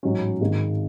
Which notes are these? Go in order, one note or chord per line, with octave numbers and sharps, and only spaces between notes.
A1 G#2 F#3 C#4
G#1 G#2 D#3 G#3